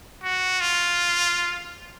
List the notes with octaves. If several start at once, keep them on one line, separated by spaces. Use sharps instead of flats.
F#4
F4